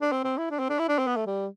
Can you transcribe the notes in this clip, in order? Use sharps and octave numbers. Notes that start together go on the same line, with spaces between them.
D4
C4
C4
E4
D4
C4
D4
E4
D4
C4
B3
A3
G3